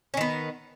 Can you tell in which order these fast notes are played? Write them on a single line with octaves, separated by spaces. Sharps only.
C#4 D#3 B3